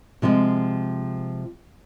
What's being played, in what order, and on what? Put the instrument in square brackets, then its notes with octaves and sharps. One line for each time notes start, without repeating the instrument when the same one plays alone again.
[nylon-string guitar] C3 F3 G#3